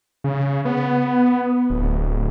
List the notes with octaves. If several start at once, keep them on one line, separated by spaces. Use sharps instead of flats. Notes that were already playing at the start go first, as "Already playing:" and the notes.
C#3
B3
D1